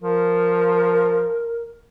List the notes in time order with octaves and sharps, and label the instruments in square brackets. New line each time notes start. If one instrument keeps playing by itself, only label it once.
[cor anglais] F3 [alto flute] A#4